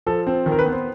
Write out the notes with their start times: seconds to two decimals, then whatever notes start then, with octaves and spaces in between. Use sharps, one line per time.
0.07 F3 A4
0.27 C4
0.46 D#3
0.52 A#4
0.59 B4
0.66 B3
0.72 C5